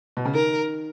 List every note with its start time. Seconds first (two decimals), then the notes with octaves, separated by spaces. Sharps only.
0.17 B2
0.25 C#3
0.34 D#3 A#4